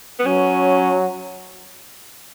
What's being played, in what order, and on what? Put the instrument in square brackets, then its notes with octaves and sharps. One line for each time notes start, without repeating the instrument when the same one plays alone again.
[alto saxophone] B3
[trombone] F#3 [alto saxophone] C#4